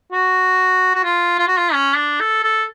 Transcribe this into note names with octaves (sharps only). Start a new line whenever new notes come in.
F#4
F#4
F4
F4
F#4
F4
C#4
D4
A4
A4